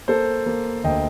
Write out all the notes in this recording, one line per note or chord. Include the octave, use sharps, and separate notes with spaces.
A#3 A4 C5
A#3
D2 D#5 G5